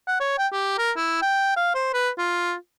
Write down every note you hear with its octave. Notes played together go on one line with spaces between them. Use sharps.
F#5
C#5
G5
G4
A#4
E4
G5
F5
C5
B4
F4